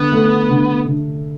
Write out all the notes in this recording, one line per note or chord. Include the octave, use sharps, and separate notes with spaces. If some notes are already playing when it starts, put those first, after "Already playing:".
Already playing: D3 B3
A3
D3
D3